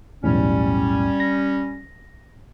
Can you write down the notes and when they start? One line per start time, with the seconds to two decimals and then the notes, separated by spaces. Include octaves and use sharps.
0.24 B1 E2 A2 G3 C#4
1.20 A#6